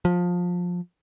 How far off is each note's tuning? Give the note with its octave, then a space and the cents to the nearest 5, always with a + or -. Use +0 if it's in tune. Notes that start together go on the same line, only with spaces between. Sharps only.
F3 +20